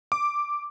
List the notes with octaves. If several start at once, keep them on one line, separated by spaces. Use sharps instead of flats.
D6